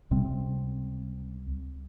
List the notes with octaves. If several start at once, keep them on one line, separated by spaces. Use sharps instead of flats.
C#2 C3 G3 C4